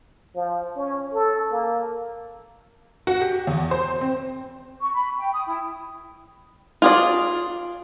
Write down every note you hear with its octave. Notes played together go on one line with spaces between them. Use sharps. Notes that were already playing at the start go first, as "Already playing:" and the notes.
F3
C#4
A4
A#3
F#4
G4
E2
C5
C4
C#6
B5
G5
D#6
E4
F4 G#4 D5